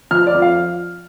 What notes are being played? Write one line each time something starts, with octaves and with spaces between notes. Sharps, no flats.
F3 F6
D5
F2
F5